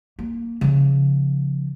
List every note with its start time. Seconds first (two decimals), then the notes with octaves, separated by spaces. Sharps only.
0.19 A#3
0.61 C#3 F3